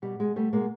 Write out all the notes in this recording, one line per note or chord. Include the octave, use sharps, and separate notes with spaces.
B2 G3
B2 G#3
B2 G3 A3
B2 G#3 A#3